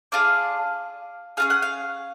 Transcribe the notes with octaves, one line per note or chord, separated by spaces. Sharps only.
D4 F4 G#4 F5
C#4 F4 G#4 F5
F#5
F5